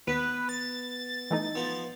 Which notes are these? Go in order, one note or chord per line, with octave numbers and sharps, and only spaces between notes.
D#2 B3 B4
A6
E3 A3 D#4
F3 B3